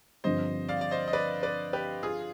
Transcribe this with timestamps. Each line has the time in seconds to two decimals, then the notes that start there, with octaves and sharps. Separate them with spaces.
0.24 G2 D3 F3 C4 C5 D#5
0.69 D5 F5
0.81 D5
0.91 C5 D#5
1.08 D#5
1.13 B4 D5
1.43 B4 D5
1.73 G4 B4
2.03 F4 G#4